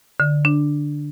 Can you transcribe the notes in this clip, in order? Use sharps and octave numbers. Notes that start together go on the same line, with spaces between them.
D3
D4